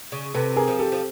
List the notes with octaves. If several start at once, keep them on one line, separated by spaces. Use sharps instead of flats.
C#3
C3 A4 B4
G#4 A#4
F3
G4 A4
F3